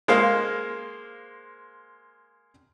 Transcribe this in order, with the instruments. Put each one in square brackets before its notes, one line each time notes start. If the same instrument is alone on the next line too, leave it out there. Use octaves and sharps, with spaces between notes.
[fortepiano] G#3 A#3 C5 F5